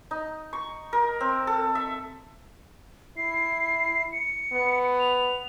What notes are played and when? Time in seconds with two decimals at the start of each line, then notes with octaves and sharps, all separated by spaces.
0.11 D#4
0.53 C#6
0.93 A#4
1.20 C4
1.47 A4
1.75 E5
3.17 E4 C7
4.12 C#7
4.53 B3
4.99 F7